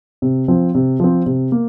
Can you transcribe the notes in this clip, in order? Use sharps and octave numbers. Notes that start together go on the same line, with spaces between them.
C3
F3 C4
C3
F3 C4
C3
A#3